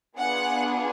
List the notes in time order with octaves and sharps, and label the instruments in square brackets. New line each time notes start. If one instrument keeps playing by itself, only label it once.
[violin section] B3 D4 F4 G#4 F#5